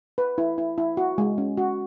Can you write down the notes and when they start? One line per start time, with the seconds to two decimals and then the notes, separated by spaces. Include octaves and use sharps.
0.18 B4
0.38 E4
0.58 E4
0.78 E4
0.97 F#4
1.18 G#3
1.38 C#4
1.57 F#4